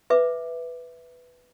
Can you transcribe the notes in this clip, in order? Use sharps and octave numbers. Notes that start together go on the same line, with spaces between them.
B4 E5 D6